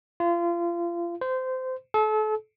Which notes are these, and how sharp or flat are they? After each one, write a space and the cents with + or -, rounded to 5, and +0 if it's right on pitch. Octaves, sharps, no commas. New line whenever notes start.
F4 -30
C5 -20
A4 -35